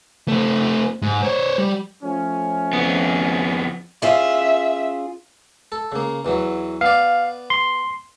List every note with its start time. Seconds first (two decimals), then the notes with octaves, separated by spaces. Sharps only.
0.28 A3 C4
1.02 G#2
1.23 C5 C#5
1.59 G3
2.03 F3 A3 C#4
2.73 F2 B3
4.02 C#4 F4 G#4 E5
5.72 A4
5.92 C#3 A#3
6.25 E2 E3 F#3
6.81 B3 D5 F5
7.50 C6